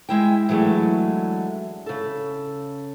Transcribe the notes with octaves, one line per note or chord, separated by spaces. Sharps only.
G#3 E4 G5
E3 F#3 G#3 A3 D4
C#3 A4